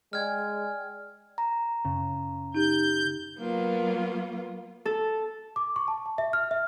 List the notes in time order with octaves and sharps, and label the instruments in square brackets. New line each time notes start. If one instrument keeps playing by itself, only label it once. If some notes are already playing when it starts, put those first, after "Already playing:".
[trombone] G#3 [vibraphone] D5 G5 G#5 [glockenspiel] F6 G#6
[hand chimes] A#5
[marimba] F#2 [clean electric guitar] C#3
[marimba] D#4 G4 [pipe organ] G6
[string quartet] F#3 A#3 B3 F4
[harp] A4
[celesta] D6
C#6
A5
A5
E5
F6
E5